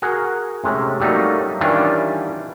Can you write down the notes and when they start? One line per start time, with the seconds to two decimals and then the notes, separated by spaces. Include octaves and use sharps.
0.02 F#4 G#4 A#4 F#5
0.64 C3 G#3 A3 C#4
1.00 F#3 G3 A3 A#3 D#4
1.61 D#3 E3 G3 C#4 D4 F4